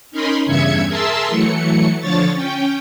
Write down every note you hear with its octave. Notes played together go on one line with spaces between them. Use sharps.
C#4 D#4 A#4 B5 C6
E2 G2 C#3 E5 G#6 C#7
G#4 A#4 E5 A5 C6 E6
E3 F#3 A3 C#7
D3 F3 C#5 C#6 A6
C#4 G5